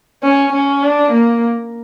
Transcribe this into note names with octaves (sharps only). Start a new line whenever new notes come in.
C#4
C#4
D4
A#3